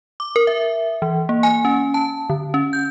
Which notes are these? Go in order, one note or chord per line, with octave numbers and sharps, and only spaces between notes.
D6
A#4
E5
E3
A#3
G#5
C#4
A5
D3
C#4
G6